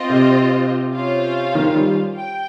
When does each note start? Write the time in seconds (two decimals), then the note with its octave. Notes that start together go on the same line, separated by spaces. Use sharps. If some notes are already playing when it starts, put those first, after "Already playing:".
Already playing: C4 F4 C5 D#5
0.10 C3
0.93 C#4 F4 C5 F5
1.55 D#3
1.75 G3
2.16 G5